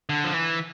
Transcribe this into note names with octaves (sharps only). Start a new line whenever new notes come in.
D3
F3
E3